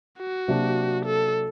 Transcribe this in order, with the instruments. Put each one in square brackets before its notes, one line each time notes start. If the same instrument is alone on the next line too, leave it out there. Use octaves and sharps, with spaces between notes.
[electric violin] F#4
[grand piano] C3 F#3 A#3 D4
[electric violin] A4